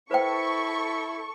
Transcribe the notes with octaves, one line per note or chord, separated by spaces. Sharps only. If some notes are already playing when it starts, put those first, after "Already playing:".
E4 A4 B4 C5 G5 C#6